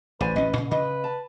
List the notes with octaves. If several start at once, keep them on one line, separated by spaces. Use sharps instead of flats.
A1 B4 C5 D5 G#5
A1 C#4 D#5
A#2 C#3 F5
C#3 B4 D#5
A5